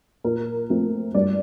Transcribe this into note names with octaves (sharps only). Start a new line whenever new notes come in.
A#2 A#4
F3 A3 C4
G2 D5